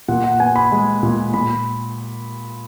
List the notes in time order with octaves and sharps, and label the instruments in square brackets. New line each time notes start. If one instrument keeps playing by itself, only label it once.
[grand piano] A#2 F#5
F#5
B3 G#5
B5
G#3
A#2
A#2 B5